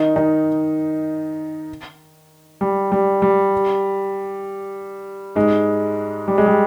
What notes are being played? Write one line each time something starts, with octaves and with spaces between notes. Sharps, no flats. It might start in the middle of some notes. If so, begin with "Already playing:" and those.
Already playing: D#3 D#4
D#3 D#4
G3
G3
G3
G#2 G#3
G3
G#3
G3